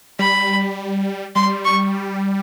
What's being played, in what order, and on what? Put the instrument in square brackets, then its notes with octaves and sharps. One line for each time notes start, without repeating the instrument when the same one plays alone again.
[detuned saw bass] G3 [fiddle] B5
[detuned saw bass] G3 [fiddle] C6
[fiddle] C#6